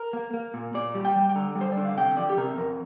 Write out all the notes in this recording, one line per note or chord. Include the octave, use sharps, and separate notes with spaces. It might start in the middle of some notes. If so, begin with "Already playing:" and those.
Already playing: A#4
A#3
A#3
A#2
A#2 D5
G3
G5
G3
G5
D3 A#5
G3
C5
D3 D5
F5
C3 G5
F3 D5
G4
C3 A#4
F2 A#4